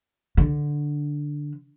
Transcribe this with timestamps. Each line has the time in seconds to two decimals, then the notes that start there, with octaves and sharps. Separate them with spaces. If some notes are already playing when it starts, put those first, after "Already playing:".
0.37 D3